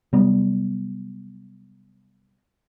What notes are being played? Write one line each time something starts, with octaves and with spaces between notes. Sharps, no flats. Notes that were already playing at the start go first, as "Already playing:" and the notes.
C3 F#3 G3 B3